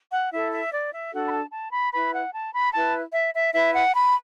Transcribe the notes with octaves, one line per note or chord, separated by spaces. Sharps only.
F#5
E4 A4 E5
E5
D5
E5
D4 F#4 A4 F#5
B5
A5
A5
B5
E4 B4 B5
F#5
A5
B5
E4 B4 A5
E5
E5
E4 B4 E5
F#5
B5